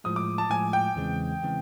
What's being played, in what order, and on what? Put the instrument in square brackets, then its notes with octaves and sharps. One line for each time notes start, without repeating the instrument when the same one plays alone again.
[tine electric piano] A2 F3 G#3 [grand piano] D#6
[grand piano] D6
A5
[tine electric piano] A2 F3 G#3 [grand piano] G#5
[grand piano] G5
[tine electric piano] E2 C#3 E3 G#3 C4
C#3 E3 G#3 C4